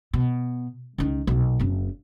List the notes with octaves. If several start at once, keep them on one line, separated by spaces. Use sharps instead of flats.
B2
C#2 D#3
B1 A#2
F#1 C4